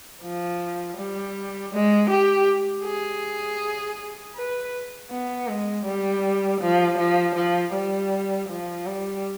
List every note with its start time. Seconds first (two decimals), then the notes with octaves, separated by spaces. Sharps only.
0.23 F3
0.97 G3
1.73 G#3
2.11 G4
2.85 G#4
4.36 B4
5.11 B3
5.48 G#3
5.86 G3
6.61 F3
6.99 F3
7.36 F3
7.74 G3
8.50 F3
8.87 G3